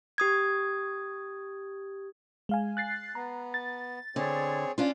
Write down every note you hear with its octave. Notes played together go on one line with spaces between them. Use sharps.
G4 D#6 G#6
G#3 F5 G#5
F#6 A6 C7
B3 A#5
A6
D3 C4 G#4 C#5
C#4 D4 F4